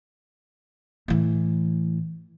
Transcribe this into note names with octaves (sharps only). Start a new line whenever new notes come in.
A2 E3